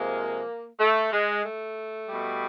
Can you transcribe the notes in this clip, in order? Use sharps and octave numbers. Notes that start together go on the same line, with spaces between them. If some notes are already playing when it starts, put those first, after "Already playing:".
Already playing: C3 F3 G#3 A#3
A3
G#3
A3
B2 G3